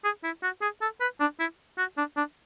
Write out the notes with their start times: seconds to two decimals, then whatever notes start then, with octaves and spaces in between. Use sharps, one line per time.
0.04 G#4
0.24 E4
0.43 F#4
0.62 G#4
0.82 A4
1.01 B4
1.20 D4
1.40 E4
1.78 F#4
1.98 D4
2.17 D4